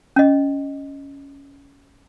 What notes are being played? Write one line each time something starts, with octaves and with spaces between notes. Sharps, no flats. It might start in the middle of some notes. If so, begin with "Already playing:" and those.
C#4 D#5